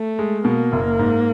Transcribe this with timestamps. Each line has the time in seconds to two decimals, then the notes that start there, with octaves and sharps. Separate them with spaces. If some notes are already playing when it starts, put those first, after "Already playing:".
Already playing: A3
0.19 G#3
0.45 B2 A#3
0.72 F#1
0.99 G#2